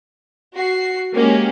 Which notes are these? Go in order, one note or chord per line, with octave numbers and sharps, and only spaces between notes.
F#4 C7
G#3 A#3 C#4 G4